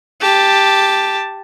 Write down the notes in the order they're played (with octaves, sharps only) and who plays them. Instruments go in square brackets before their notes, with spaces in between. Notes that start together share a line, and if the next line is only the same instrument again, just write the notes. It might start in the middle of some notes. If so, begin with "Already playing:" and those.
[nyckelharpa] G4 A5